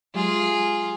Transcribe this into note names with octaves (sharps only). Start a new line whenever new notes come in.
F#3 G#3 F4 G4 G#4